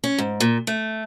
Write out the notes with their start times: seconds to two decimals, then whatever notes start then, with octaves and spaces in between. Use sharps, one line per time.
0.04 C#4
0.18 G#2
0.40 A#2
0.67 A3